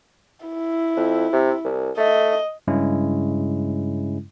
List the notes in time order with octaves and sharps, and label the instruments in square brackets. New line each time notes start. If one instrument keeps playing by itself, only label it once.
[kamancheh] E4
[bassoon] F2
C3
C2
[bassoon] A3 [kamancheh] D#5
[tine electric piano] G2 C#3 G#3 C#4 E4